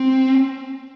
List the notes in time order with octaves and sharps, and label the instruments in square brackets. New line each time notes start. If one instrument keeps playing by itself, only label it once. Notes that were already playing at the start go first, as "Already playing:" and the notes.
Already playing: [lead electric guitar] C4